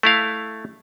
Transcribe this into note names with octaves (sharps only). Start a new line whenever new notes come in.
A3 E4 F5